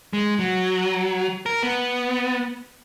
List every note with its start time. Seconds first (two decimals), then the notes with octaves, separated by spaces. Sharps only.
0.13 G#3
0.39 F#3
1.46 A#4
1.63 B3